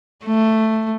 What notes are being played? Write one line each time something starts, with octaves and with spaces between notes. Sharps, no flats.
A3